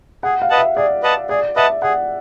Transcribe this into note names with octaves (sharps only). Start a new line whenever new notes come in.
G#4 F#5
F5
B4 D#5 F#5 A5
E5
G#4 D5
B4 D#5 F#5 A5
G#4 D5
B4 D#5 E5 F#5 A5
G#4 F#5